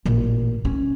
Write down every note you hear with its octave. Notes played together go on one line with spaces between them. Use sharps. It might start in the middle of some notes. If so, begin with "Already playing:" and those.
A1 A#2
C#4